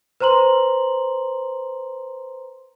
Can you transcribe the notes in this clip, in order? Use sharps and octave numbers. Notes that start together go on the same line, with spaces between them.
B4 C5 A#5 C6 F#7